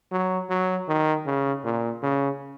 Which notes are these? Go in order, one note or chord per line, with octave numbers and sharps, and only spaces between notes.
F#3
F#3
D#3
C#3
A#2
C#3